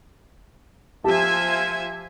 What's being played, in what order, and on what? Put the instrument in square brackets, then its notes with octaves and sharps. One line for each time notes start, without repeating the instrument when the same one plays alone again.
[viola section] F3 E5 G#5 [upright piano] G4 A5